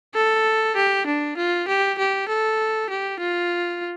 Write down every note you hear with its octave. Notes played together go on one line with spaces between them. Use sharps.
A4
G4
D4
F4
G4
G4
A4
G4
F4